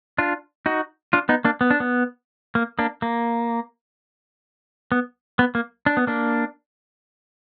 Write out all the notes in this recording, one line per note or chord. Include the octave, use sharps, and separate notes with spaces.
D4 F4
D#4 F#4
D4 F4
B3 D#4
A#3 D4
B3
D4
B3
A#3
A#3 D4
A#3
B3
B3
A#3
D4
B3
A#3 D4